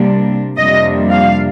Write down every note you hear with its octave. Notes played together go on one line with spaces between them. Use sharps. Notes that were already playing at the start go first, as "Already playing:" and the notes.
Already playing: C3 G3 A#3 D4
F2 C3 G3 A#3 D4 D#5
F5